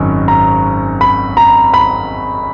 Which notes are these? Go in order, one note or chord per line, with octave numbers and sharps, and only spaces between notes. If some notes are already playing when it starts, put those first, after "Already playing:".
Already playing: G#1 F#2 D#3
A#5
B5
A#5
B5